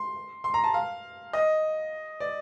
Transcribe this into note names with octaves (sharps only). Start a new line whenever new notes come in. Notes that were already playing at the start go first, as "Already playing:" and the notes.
Already playing: C6
C6
A#5
A5
F5
D#5
D5